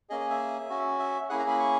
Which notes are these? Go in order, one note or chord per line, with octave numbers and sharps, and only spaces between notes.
A#3 C#4 G#4 D#5
D#5
E5
C#4 F#4
E5
A#3 C#4 E4 G#4 F#5
A#5
B5
C#6